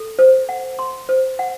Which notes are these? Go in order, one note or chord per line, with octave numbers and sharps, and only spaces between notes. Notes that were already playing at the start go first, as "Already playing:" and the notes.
Already playing: A4
C5
F#5
C6
C5
F#5